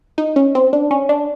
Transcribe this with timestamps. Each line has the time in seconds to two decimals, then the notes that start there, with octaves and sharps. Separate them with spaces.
0.18 D#4
0.36 C#4
0.55 C4
0.73 D4
0.91 C#4
1.09 D4